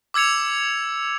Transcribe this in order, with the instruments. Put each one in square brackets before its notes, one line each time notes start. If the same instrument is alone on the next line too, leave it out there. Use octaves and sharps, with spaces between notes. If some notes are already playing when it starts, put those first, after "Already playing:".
[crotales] D6 E6 G#6 C#7 F7